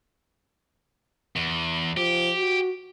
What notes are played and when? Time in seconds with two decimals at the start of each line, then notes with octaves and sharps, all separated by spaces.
1.36 E2
1.97 F3 G4
2.37 F#4